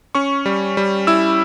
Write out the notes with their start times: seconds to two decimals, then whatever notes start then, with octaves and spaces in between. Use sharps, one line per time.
0.15 C#4 C#6
0.46 G3
0.77 G3
1.07 E4 E6